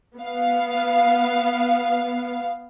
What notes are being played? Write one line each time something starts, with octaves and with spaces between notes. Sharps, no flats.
B3 F5